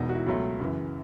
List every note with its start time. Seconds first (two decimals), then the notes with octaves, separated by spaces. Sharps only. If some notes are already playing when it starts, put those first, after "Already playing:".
Already playing: E1 E2 B2 D#4
0.09 F#4
0.15 E4
0.26 C#2 B2 F#3 A3
0.60 F#2 C#3 E3